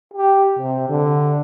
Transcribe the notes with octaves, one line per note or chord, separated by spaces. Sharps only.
G4
C3
D3